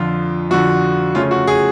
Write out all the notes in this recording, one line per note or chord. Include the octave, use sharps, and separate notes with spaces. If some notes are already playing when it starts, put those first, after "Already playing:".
Already playing: F2 D3 F3 F4
F2 D3 F3 F#4
C#3 F3 A3 C#4 F4
F#4
G#4